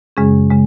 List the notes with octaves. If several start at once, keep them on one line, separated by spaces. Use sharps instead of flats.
F#2 C#3 G#3 C#4 G#4
C#3 G#3